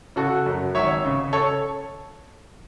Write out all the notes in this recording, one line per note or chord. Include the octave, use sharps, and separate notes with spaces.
C#3 F#4 A4
F#2
G#1 C#5 E5
C#3
A4 C#5